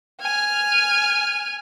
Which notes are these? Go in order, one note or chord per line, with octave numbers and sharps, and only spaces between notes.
G#5 F6